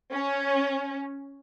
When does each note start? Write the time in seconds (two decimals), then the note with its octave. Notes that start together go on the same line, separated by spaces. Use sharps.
0.12 C#4